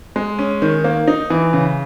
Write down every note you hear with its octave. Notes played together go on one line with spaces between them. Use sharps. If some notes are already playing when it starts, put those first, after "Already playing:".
G#3
C#4
D#3
A#3
D#4
E3
C#3